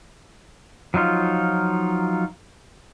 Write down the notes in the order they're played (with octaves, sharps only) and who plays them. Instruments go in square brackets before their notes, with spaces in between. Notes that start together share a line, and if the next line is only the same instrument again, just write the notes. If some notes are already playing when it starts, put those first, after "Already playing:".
[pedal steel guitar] F3 F#3 D#4 F4